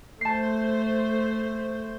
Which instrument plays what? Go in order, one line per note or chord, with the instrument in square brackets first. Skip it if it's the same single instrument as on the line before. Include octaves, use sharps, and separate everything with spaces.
[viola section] A3 C5 [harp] A5 C7